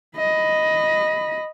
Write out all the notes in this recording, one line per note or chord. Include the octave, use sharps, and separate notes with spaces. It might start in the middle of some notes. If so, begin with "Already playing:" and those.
D#5 B5